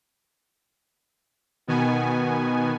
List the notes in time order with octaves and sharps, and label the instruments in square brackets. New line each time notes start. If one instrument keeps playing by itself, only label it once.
[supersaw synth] B2 D#3 B3 G#5